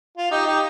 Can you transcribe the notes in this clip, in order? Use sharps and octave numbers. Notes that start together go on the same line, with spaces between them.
F4
D#4 G4
D#4 G4